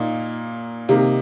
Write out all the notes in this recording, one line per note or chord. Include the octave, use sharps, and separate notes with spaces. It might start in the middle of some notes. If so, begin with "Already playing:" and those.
Already playing: A#2 A#3 D#4
C3 D#3 A#3 D#4